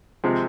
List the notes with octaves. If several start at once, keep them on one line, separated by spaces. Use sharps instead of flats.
C3 F3 G#3 C4